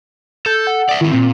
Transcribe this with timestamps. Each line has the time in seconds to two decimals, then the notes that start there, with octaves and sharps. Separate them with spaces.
0.46 A4 G6
0.67 F#5
0.89 D5 E5
1.01 D#3 C4 E4
1.13 A#2 C4